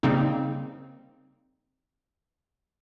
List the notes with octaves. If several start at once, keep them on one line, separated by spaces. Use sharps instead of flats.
C#3 G3 A#3 C4 D#4